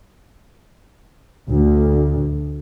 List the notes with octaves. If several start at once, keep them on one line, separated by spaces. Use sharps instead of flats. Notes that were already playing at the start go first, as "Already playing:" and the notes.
D2